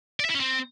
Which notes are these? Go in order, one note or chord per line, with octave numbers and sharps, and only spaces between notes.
D5
E5
E4
C#4
C4